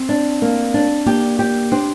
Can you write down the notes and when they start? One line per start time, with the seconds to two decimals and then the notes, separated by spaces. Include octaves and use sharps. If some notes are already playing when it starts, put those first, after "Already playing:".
Already playing: C4
0.09 D4
0.42 A#3
0.74 D4
1.06 A#3 G4
1.39 G4
1.72 C4 D4